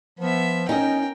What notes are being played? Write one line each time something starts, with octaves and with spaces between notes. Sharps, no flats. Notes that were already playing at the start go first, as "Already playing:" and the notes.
F3 B3 E5
C#4 D#4 A#4 D#5 G5